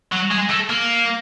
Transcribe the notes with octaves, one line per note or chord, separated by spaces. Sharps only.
F#3
G#3
A3
A#3